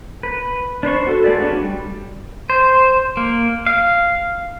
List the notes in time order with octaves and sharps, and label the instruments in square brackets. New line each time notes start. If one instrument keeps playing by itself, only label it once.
[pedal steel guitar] B4
D4 B4 C5 C#6
F#4 A4
A3 F4 G#4 B4 D5
C#4 D4 F#4
G3
C5
A#3
F5